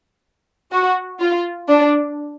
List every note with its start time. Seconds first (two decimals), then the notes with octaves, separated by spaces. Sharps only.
0.72 F#4
1.20 F4
1.69 D4